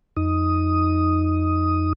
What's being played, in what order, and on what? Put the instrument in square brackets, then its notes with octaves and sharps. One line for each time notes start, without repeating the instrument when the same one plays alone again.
[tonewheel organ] F2 D#4 D#6